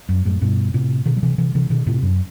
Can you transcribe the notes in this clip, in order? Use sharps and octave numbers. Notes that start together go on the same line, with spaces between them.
F#2
F#2 A2
G2 B2
A2 C3
B2 D#3
F#3
C3 E3
C3 E3
C3 E3
B2 D#3
A2 C3
F#2